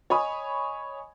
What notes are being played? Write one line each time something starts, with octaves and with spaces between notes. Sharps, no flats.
C#5 D#5 G#5 B5 D#6